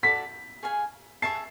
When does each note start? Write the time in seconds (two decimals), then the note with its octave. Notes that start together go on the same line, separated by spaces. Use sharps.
0.03 F#4 A4 D5 B6
0.63 G#4 C#5 F5 G#5
1.22 G#4 C#5 E5 A5 C7